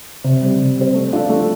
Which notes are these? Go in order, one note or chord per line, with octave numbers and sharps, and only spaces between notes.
C3
G3 C4
C3
G3 C4
A3
D4 F4 A4
A3